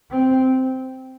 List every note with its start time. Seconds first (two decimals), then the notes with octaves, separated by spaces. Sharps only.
0.11 C4